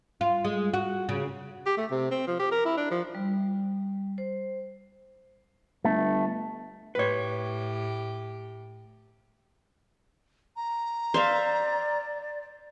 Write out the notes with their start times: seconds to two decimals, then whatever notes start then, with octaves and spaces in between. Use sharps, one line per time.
0.21 F4
0.44 G#3
0.74 F#4
1.09 C#3
1.66 G4
1.77 A3
1.91 C3
2.11 C4
2.27 F3
2.39 G4
2.52 A#4
2.65 E4
2.77 D4
2.91 F3
3.15 G3
4.18 C5
5.85 G1 A3
6.95 A2 G4 B4 C#5
10.56 A#5
11.14 C5 D5 E5 F5